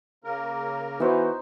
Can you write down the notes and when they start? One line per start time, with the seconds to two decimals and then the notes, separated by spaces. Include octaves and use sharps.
0.24 C#3 A#3 A#4
1.00 E3 B3 D#4 F#4 C5